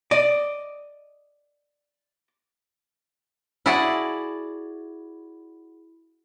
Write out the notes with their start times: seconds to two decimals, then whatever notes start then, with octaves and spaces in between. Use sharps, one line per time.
0.11 D5 D#5
3.66 E4 F#4 G#4 D5 F#5 A5